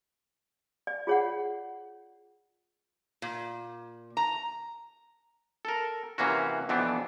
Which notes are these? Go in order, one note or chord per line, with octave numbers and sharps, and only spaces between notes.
D5
F4 G#4 C#5 D5 F#5
A#2
A#5
A4 A#4
C3 E3 A#3 C#4 F#4
F2 B2 E3 B3 C4 D4